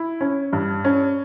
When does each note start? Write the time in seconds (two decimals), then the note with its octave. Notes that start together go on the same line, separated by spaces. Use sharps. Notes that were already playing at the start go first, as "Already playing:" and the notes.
Already playing: E4
0.21 C#4
0.53 G2
0.85 C#4